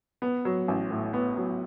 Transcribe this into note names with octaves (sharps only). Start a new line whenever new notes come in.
B3
F#3
A1
A2
B3
F#3